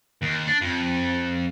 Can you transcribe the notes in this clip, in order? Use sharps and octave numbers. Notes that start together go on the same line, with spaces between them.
D#2
D4
F2